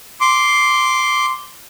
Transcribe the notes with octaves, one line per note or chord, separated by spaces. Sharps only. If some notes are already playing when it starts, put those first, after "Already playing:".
C6 D6